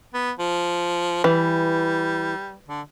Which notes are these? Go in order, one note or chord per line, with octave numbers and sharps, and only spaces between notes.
B3
F3
E3 G3
D3